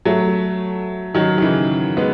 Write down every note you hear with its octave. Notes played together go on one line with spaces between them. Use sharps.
F#3 A3
D#3 F#3
D#3
C#3 E3
G#3 B3